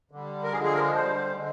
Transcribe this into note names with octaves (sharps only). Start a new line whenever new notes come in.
D3 G3
A#4
D3 F3 G#3 G#4
G#4
A#4
D3 G3 C5
D3 G#3